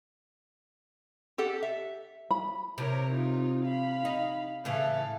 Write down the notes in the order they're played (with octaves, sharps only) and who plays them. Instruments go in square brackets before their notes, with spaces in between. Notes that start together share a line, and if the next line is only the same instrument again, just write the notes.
[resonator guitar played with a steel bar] G4 A4 F#5
E5
[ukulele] B5
[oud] C3 [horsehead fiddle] A#4 C#5
[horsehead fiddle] D#4 F4
F5 B5
[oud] D#4
[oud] A2 C#3 E3 [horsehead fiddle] A4 F5